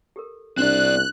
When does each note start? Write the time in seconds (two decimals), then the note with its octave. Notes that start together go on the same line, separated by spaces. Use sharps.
0.16 G4 A4 A#4
0.57 C2 C4 D4 D5 F#6